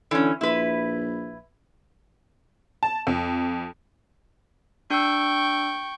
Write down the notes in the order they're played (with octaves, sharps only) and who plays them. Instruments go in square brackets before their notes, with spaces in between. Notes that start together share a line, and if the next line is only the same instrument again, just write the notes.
[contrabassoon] D3 [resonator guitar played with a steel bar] E3 C#4
[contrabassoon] A#1 [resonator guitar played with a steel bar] E4 B4
[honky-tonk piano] A5
F2
[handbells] D4 E6 [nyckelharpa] G5 C#6